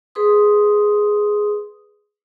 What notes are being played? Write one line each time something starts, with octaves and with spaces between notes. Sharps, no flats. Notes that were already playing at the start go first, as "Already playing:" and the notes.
G#4 B4 C6 D#6